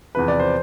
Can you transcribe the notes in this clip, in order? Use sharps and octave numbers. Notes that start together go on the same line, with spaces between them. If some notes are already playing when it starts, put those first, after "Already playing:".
E2 C3 F3 B4
D5
C5